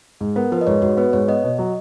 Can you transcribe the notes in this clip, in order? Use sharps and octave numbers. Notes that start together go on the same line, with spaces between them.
G#2
B3 A#4
F3 B4
D#5
G#2 C#5
G#2 F#4
B3 B4
G#2 C#5
B3 D#5
B2
F#3